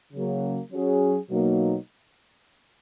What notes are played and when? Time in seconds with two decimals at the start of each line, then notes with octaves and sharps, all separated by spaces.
0.13 C#3 F#3 A#3
0.72 F#3 C#4 G#4
1.30 B2 F#3 A#3 D#4